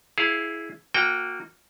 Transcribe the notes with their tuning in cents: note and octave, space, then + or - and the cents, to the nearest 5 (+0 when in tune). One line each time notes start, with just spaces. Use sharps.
E4 +0 G#4 +20 F5 +15
A#3 -15 F#4 -30 G5 -5